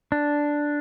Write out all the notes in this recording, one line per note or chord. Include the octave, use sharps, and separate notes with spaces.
D4